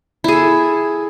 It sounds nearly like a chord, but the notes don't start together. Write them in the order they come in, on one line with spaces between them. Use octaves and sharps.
E4 G#4 A4